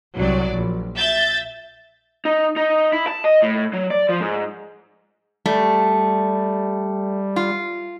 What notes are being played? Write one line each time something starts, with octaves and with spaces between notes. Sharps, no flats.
C2 F#3 D5
A#1
E5 G6 A6
D#4
D#4
E4
A5
D#5
A2
F#3
D5
F3
G#2
G3 A3
F4